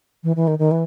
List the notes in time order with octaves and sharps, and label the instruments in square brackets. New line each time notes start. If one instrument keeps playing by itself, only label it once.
[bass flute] E3
E3
D#3
D#3
E3